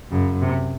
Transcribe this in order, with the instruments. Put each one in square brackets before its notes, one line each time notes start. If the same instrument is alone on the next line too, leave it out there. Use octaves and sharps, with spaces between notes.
[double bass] F#2 [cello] C#3
[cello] C3